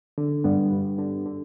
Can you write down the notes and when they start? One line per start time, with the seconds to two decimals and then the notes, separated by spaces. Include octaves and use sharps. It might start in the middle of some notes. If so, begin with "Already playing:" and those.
0.18 D3
0.44 G2 G3 B3
0.72 G2
0.98 D3
1.26 D3